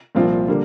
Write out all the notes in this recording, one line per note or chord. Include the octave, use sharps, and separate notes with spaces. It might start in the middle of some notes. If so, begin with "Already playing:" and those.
C2 A#2 F3 C4 F4
D3 G3 A#3